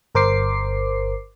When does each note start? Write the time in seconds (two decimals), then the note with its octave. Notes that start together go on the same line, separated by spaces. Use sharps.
0.15 G1 A#4 C5 D6 C7